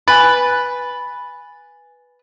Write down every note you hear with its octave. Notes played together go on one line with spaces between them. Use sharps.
B4 G#5 A6